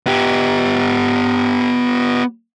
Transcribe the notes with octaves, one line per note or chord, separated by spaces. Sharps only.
B3 G4